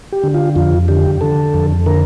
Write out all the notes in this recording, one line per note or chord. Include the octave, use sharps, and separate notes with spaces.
G4
D3
F4
F2 F4
D3 G4
D3 A4
F2
D3 A#4